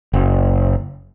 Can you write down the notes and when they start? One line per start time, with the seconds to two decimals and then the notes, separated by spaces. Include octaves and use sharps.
0.13 F#1